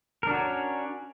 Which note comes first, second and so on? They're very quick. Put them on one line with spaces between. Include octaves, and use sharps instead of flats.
A#4 D4 F#4 C#5 C#4